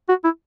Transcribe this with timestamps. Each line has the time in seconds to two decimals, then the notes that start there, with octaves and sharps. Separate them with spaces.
0.09 F#4
0.24 E4